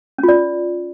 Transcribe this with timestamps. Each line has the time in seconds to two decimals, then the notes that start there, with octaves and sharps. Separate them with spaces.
0.18 C#4
0.23 F4
0.28 D5